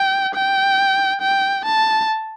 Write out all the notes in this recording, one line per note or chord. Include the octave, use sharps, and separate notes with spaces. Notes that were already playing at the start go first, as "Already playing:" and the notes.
Already playing: G5
G5
G5
A5